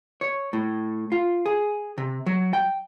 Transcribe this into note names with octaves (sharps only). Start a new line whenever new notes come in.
C#5
A2
F4
G#4
C3
F#3
G5